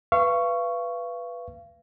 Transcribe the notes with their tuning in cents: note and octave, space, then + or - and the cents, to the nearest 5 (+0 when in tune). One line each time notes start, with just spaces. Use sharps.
B4 +0 F5 -35 C#6 +0